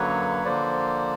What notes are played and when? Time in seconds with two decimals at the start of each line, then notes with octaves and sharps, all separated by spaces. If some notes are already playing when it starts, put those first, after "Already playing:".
Already playing: F#2 D3 F#3 A#3 B4 C#5
0.45 D3 F3 A#3 C5 D5